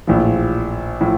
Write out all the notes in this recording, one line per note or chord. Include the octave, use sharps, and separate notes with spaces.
A#1 A2 F3
A2 F3